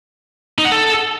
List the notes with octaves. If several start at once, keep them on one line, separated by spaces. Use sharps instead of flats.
D#4
F#5
A4